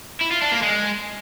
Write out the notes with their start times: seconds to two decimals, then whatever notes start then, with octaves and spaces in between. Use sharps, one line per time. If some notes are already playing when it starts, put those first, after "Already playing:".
0.21 E4
0.31 F4
0.42 D4
0.52 A#3
0.62 G#3